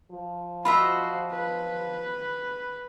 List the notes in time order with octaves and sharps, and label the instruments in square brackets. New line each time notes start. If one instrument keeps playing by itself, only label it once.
[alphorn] F3
[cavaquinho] F4 D#5 E5 [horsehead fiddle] F#4 C5 [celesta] B5
[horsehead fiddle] B4